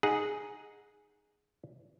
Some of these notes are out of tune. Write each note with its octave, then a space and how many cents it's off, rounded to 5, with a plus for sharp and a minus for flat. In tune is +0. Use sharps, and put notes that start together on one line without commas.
D#4 +0 G#4 +0 F#5 -10